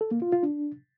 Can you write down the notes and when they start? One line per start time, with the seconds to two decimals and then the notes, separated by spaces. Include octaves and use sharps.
0.01 A4
0.11 A#3
0.22 F4
0.32 F4
0.43 D4